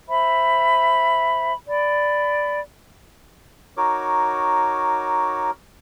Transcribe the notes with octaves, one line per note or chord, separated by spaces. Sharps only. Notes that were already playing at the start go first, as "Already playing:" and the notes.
C5 E5 B5
D5 B5
D#4 F#4 A#4 C#5 D6